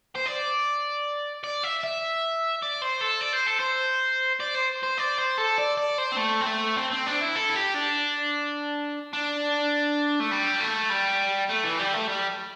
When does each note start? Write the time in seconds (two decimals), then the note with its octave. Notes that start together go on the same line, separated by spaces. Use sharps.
0.15 C5
0.26 D5
1.44 D5
1.64 E5
1.84 E5
2.62 D5
2.82 C5
3.01 A4
3.21 D5
3.33 C5
3.47 A4
3.60 C5
4.40 D5
4.55 C5
4.84 C5
4.98 D5
5.19 C5
5.38 A4
5.58 D5
5.77 D5
5.98 C5
6.12 C4
6.17 A3
6.41 C4
6.47 A3
6.77 C4
6.91 C4
7.06 D4
7.20 E4
7.36 A4
7.50 E4
7.56 G4
7.74 D4
9.13 D4
10.20 A3
10.31 G3
10.61 A3
10.90 G3
11.50 A3
11.64 E3
11.79 G3
11.94 A3
12.09 G3